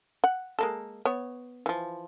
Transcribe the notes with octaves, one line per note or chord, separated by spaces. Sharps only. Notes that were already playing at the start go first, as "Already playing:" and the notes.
F#5
G#3 A#3 A4
B3 C#5
E3 F3